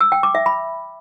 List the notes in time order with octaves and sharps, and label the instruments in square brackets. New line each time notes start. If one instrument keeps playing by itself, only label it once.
[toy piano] E6
G5
D6
E5
B5